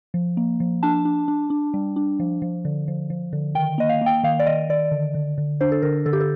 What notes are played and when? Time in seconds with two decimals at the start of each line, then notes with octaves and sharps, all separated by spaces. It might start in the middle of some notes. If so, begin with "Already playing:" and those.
0.14 F3
0.37 A#3
0.60 F3
0.83 D4 A5
1.05 D4
1.28 D4
1.50 D4
1.74 G3
1.96 D4
2.20 F3
2.42 F3
2.65 D3
2.88 F3
3.10 F3
3.33 D3
3.55 D#3 G5
3.78 A#3 D#5
3.89 F5
4.01 A#3 G5
4.23 D#3 F5
4.39 D5
4.46 D#3 D#5
4.70 D#3 D5
4.92 D3
5.15 D3
5.38 D3
5.61 D4 C5
5.72 A4
5.82 D3 A#4
6.06 D3 A4
6.13 G4
6.20 A4